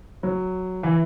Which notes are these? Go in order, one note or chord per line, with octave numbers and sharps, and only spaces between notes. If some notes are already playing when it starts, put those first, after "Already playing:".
F#3
E3